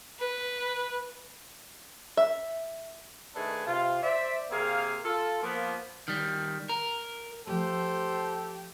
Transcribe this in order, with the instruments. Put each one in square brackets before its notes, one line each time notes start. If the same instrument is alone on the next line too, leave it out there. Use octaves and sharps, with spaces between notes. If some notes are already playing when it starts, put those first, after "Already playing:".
[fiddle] B4
[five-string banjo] E5
[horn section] D#3 A3 D4 G#4 A4 B4
C3 F4
C5 D5 E5
C3 A#3 C4 G#4 F5
F4 A4
F3 A#3 B3
[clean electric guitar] D#3 G3
A#4
[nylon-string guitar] F3 A3 [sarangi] G4 [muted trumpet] A4 [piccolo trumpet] C5